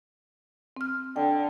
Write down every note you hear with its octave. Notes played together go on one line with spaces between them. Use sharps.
C4 F6
D3 G5